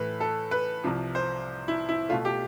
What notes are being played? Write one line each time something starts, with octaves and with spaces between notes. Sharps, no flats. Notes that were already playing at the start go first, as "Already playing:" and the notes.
Already playing: A2 E3 A3 B4
A4
B4
C2 C3 F3
C5
E4
E4
B2 A3 F4
G4